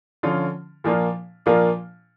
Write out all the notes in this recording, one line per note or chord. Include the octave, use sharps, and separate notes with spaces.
D3 F3 C#4 F4
A#2 F3 A#3 D4 F4
A#2 F3 A#3 D4 F4